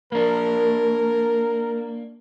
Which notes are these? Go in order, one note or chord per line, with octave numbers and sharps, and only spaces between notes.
A#3 D4 A#4